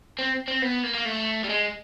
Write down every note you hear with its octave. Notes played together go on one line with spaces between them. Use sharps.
C4
C4
B3
A#3
A#3
A3
G3
G#3